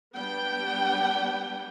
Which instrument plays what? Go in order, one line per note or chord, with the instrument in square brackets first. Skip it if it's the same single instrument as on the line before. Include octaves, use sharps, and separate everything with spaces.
[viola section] G3 B3 D4 G5